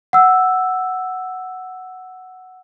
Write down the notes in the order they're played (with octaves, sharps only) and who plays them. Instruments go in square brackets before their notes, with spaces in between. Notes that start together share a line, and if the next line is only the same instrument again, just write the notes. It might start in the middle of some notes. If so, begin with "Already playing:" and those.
[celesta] F#5 E6